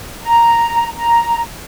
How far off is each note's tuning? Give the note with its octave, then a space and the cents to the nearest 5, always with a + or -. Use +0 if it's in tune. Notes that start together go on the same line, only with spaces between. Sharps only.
A#5 +0
A#5 +5